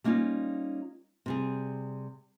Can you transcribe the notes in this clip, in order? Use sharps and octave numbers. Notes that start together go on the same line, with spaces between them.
G3 A#3 C#4 D#4 F4
C3 G3 G#4